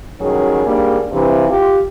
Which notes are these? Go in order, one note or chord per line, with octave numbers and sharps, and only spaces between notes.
B2 D#3 F#3 G3 C#4 G#4
G#2 G3 A#3 D4 G#4 D5
G2 C3 E3
F4 G4